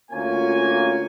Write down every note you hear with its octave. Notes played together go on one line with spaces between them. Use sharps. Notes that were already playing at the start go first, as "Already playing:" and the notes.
D2 A#3 C#4 F4 G#5